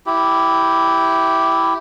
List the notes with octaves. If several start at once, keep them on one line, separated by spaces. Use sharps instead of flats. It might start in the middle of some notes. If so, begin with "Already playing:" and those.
E4 G4